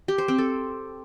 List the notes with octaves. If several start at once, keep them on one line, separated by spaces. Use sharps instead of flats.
G4
C5
C4
A4